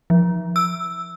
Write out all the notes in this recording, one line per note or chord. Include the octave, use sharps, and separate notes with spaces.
F3
E6